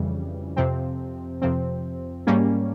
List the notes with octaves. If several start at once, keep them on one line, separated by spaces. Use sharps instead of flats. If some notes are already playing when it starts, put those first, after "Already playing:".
Already playing: F2 C#3 E3 G3
F2 C3 F3 C4
F2 C3 F3 C4
G#2 G3 A#3 C#4